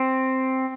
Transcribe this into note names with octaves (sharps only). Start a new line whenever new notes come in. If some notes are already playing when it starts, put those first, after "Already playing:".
Already playing: C4